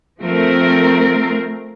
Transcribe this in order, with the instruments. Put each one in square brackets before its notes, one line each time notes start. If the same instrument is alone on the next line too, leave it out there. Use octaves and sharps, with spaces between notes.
[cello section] F3 A3 C4 A#4